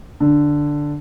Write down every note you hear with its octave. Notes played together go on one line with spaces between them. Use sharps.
D3